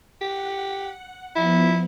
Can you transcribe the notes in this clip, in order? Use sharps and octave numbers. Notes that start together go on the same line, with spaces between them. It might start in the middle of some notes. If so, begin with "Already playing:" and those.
G4 F#5
F3 B3 E4